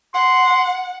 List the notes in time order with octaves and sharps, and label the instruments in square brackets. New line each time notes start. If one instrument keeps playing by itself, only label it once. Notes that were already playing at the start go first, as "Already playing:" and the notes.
[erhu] F#5 [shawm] C6